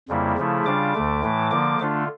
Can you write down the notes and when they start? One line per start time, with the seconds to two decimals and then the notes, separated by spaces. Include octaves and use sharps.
0.08 F2 C#3 G3 A#3 E4
0.37 C#3 F3 A3 E4
0.65 C#3 G3 D4 F4 D6
0.94 D2 D3 A3
1.23 A2 E3 A3
1.50 D3 F3 A#3 D6
1.80 D3 A3 D4 F4